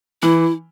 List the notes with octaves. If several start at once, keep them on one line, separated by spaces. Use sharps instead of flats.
E3 E4